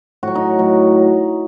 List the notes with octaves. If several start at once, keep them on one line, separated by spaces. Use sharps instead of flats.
A2 F#3 F#4
D#4
A2 F#3